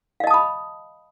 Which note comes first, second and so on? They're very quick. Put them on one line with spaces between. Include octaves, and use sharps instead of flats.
F5 D#5 A5 D#6 B5